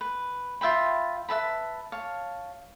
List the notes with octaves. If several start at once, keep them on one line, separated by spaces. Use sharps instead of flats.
B4
F4 E5 G5 B5
B4 E5 A5 B5
C#5 F5 A5